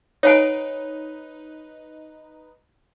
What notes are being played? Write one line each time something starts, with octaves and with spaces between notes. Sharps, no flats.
D#4 B4 C#5 F#5 G#5